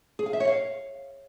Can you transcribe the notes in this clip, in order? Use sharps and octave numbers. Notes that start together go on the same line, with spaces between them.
G#4
F5
E5
C#5
F5